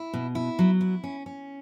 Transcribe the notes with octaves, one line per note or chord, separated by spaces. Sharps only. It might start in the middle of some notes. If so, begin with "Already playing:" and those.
Already playing: E4
B2
E4
F#3
E4
C#4
C#4